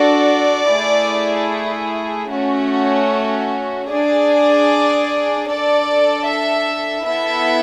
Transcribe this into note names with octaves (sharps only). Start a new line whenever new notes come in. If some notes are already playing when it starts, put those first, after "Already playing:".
Already playing: D4 F#4 A4 D5
A3 E4 G#4
A3 C#4 F#4
D4 G#4 D5
D4 A4 D5
E5
B3 E4 A4 E5